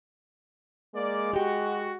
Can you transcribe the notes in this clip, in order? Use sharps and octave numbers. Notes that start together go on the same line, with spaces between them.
G#3 A#3 D5
F#4 G4 G5